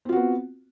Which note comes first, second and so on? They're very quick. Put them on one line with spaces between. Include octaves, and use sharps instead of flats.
C4 F4 F#4 B3